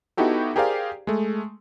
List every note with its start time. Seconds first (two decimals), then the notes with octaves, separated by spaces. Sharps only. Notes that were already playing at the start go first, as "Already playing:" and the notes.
0.17 B3 D#4 E4 F#4 G4 A4
0.56 G4 G#4 A#4 C5 D5 F5
1.07 G#3 A3